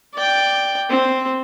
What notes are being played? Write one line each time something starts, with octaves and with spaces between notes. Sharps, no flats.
D5 G5
C4